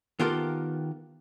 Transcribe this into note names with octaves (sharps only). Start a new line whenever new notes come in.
D#3 B3 F4 G4 A4 A#4